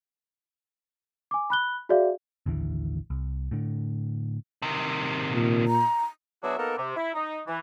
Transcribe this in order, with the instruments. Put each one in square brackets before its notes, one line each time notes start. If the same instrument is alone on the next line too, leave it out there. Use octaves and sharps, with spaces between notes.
[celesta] G#5 D6
B5 F#6 G7
F#4 G#4 D5 E5 F5
[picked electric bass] A1 D#2 D3 E3
C2
A2 D3
[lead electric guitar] C3 D#3
[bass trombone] A#2
[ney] A#5
[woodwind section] F#3 B3 D4 F#4 G#4 E5
A#3 B3 D#4 A4 A#4
C3
E4
D#4
E3